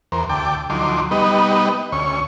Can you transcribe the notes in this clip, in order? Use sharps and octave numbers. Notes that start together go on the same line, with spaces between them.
E2 A#4 C5
D2 G5 A5 D6
D2 F3 F#3 D#4 C6 D6
G3 B3 D#4 B4 D#5
D2 C#4 C#6